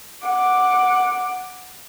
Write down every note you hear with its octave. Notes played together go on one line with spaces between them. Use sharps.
F#5 D6